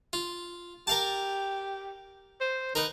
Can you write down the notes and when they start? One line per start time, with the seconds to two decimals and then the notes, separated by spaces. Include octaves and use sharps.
0.13 F4
0.87 G4 A#4 F5 A5
2.41 C5
2.75 D#3 A#4 B4